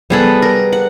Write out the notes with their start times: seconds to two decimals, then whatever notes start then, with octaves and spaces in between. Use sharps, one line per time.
0.10 G3 B3 G#4 A4 B4
0.42 A#4
0.73 F#5